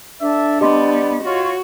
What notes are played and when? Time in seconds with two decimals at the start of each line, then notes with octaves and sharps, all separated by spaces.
0.21 D4 A4 D5 E5
0.61 G3 B3 G4 D5 D#5 C6
1.24 F4 F#4 C#5